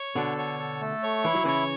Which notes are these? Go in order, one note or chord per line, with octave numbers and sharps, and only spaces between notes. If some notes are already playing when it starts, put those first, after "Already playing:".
Already playing: C#5
B2 D3 A4
C#5
A4
A3
C#5
E3 E4
F#3
C#3 E3 C#5